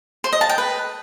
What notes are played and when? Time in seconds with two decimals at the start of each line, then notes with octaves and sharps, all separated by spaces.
0.24 C5
0.33 D#5
0.41 A5
0.49 G5
0.58 B4